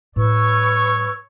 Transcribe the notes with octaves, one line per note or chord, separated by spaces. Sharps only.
A2 G3 B4 C#5 C#6 E6